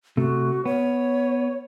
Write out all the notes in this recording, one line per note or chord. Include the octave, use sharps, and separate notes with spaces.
C3 A3 F#4
B3 C#5